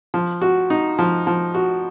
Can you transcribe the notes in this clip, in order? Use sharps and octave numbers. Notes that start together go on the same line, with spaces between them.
F3
F#4
D#4
F3
F3
F#4